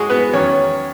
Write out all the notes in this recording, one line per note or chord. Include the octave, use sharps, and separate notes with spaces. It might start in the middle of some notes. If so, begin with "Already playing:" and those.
Already playing: G#2 G#3 F#4 G#4
B3 B4
E2 D#3 F#3 C#4 C#5